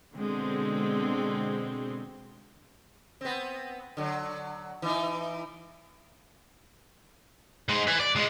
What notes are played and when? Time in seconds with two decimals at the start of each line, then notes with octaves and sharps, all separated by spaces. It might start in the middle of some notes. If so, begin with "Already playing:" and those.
0.15 B2 D3 G#3 C4
3.21 B3 C4
3.97 D3 F#3
4.82 E3 D#4
7.69 G#2 G#3
7.87 B4 G#5
8.00 D5
8.15 C#2 G#3